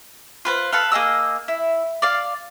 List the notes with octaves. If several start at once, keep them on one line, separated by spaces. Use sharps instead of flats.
F4 B4 C5
A4 B4 F5
A#3 G#4 D#5 E6
E4
D5 F5